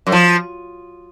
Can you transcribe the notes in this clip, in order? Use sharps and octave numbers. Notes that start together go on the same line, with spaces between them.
F#2
F3